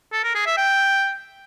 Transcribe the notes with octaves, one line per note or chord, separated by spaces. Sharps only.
A4
A#4
G#4
E5
G5